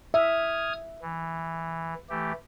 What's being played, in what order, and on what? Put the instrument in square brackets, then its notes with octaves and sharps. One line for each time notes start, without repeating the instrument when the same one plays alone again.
[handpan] E5 [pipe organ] D#6 F6 G#6
[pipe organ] E3
E3 A3 G4